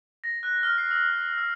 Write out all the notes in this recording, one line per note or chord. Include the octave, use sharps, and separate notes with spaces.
A#6
F#6
F6
C7
E6
F#6
E6